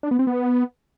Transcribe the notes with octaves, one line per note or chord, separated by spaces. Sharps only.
D4
B3
C4
B3